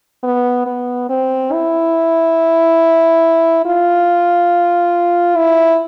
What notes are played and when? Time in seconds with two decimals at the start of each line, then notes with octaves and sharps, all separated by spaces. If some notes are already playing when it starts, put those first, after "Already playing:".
0.24 B3
0.66 B3
1.09 C4
1.52 E4
3.65 F4
5.37 E4